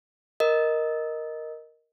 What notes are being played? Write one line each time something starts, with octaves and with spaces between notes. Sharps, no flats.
A#4 D#5